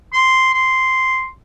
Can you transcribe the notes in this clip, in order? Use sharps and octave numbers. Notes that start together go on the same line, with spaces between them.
C6
C6